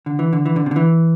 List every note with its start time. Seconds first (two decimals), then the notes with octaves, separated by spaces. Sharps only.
0.06 D3
0.19 E3
0.33 D3
0.46 E3
0.56 D3
0.66 C3
0.71 D3
0.76 E3